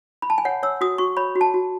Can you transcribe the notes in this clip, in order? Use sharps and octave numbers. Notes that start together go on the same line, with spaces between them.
B5
A5
G#5
C#5 F#5
C#5 E6
F#4 D#6
F#4 C#6
C#5 B5
F#4
A5
F#4